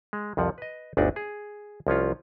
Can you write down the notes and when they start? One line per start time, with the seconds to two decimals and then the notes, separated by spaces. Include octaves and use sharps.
0.13 G#3
0.37 C2 F2 F3 F#5
0.58 B4 D#5
0.97 G1 D2 D4 D#4 D5
1.16 G#4
1.87 C2 F3 C#4 F4